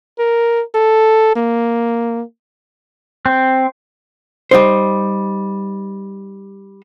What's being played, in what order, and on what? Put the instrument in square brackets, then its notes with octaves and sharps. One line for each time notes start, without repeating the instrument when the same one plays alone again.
[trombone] A#4
A4
A#3
[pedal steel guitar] C4
[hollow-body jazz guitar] G3 D#4 C5